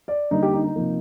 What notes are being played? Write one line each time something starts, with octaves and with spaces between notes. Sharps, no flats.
D5
D3 G3 A#3 D#4
G4
D#4
D#4
C3 F3 A#3